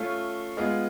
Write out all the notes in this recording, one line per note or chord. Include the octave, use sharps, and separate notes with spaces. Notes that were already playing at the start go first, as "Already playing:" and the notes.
Already playing: A3 C#4 F4
G#3 B3 F4 G#4